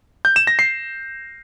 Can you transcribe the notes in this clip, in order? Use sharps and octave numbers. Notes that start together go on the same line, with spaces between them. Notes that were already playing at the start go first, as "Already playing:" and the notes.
G6
E7
A#6
C7